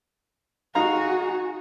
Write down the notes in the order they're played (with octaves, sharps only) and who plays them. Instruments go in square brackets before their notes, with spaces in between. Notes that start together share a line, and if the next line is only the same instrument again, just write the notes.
[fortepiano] D#4 F5 A#5 [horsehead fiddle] F#4 G#4